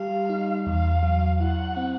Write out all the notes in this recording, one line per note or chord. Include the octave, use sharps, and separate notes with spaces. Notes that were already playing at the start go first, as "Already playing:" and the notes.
Already playing: G3 G4 F5
D#4
E2 F5
F#3
E4 F#5
C4